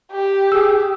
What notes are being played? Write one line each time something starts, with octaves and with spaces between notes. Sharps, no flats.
G4
G#4 E6